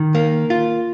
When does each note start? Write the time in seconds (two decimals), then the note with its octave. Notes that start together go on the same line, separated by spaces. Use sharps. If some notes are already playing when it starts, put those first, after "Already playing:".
Already playing: D#3
0.15 A#3
0.50 F4